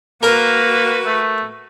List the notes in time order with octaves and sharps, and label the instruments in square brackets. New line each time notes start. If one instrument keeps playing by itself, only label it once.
[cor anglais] A#3 [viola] F#4 B4 [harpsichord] A#4
[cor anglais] A3